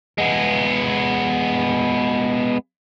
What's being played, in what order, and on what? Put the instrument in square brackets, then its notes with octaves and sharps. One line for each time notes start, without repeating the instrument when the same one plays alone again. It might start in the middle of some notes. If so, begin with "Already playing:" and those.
[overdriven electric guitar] G#3 B3